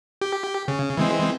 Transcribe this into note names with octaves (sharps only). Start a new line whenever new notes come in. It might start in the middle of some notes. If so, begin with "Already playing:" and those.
G4
C#3
E3 G#3 C4